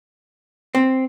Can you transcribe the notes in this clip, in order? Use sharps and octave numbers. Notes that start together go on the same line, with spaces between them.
C4